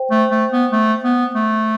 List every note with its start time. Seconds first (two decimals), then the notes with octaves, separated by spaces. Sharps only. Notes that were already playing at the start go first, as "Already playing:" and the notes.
Already playing: C5 G5
0.11 A3
0.31 A3
0.52 B3
0.73 A3
1.04 B3
1.35 A3